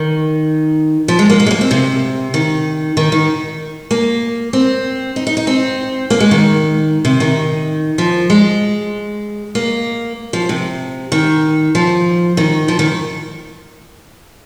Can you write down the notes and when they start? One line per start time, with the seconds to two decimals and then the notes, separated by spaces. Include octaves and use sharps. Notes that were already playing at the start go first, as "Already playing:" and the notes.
Already playing: D#3
1.08 F3
1.19 G#3
1.30 A#3
1.40 A#3
1.46 G#3
1.51 A#3
1.61 C4
1.71 C3
2.34 D#3
2.97 D#3
3.12 D#3
3.91 A#3
4.53 C4
5.16 D#4
5.27 D#4
5.37 D#4
5.47 C4
6.10 A#3
6.20 G#3
6.31 D#3
7.05 C3
7.20 D#3
7.98 F3
8.30 G#3
9.55 A#3
10.33 F3
10.49 C3
11.12 D#3
11.75 F3
12.37 D#3
12.68 F3
12.79 D#3